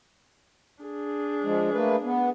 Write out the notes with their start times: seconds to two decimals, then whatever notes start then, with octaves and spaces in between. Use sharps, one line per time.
0.83 D4 G#4
1.44 F3 G#3
1.73 A3 A#3 B4
2.03 B3